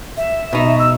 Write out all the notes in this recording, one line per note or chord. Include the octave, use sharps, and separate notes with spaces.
E5
B2 D#4
E6